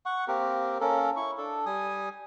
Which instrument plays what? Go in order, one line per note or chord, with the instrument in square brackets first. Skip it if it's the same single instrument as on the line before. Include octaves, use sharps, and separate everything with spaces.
[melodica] F#5 C#6
A#3 C4 G4 A#4
A#3 C#4 A4 A#4
E4 C#6
D4 A4
G3 G#5 D#6